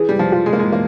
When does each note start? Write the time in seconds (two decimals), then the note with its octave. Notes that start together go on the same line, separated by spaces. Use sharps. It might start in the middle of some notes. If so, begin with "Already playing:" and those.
Already playing: E3 G#4
0.09 G3
0.19 F3
0.32 F4
0.46 G#3
0.53 A#3
0.59 G#3
0.72 E3 A#3